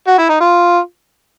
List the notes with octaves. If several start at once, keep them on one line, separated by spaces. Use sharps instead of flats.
F#4
E4
D#4
F4